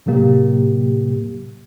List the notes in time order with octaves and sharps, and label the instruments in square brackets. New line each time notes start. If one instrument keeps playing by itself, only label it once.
[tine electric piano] A2 C3 F#3 A#3 G4